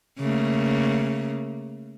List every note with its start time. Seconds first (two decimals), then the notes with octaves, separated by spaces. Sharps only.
0.19 C#3 A3 A#3